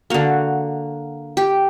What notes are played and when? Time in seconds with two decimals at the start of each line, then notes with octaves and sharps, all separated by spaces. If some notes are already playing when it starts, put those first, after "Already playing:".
0.10 D3 A#3 F#4
1.37 G4